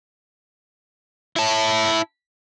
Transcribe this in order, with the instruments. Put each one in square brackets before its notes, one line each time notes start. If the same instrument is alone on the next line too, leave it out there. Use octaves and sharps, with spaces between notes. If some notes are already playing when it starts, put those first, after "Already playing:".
[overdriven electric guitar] E4 A5